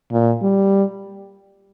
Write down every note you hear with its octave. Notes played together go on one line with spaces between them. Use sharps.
A#2
G3